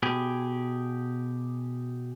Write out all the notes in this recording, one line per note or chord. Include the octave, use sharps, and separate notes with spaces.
B2 G4 G#4